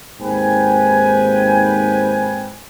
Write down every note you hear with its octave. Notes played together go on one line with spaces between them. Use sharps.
D#2 G#2 C4 B4 G5 G#5